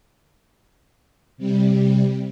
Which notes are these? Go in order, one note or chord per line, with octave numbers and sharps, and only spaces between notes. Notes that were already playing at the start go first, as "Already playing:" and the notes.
C3 G3